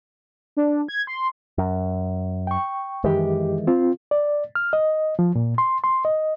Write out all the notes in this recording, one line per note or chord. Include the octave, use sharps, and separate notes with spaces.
D4
G#6
C6
F#2
G5 C#6
F#2 D#3 E3 G#3 G4
C4 F4
D5
F6
D#5
F3
A#2
C6
C6
D#5